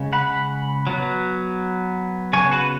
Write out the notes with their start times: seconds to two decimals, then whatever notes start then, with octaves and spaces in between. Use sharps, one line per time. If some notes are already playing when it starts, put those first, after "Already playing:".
Already playing: C#3 G#3 C#4
0.13 F#5 B5
0.87 F#3 B3
2.33 C#3 B3 G#5 C#6
2.51 F#4 B4